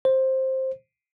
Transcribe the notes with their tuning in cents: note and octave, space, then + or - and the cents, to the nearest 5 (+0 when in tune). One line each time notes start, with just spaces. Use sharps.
C5 +10